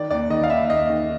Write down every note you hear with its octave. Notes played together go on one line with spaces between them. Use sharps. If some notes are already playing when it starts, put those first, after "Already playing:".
Already playing: D#3 D5
D#2 D5
D#3 D#5
F5
D#2 E5
D#2 D#5
D#3